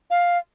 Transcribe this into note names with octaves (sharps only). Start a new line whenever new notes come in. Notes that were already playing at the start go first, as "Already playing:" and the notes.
F5